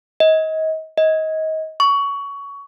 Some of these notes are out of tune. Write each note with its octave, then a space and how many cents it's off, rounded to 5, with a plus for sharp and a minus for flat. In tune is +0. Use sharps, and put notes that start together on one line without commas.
D#5 +30
D#5 +25
C#6 +20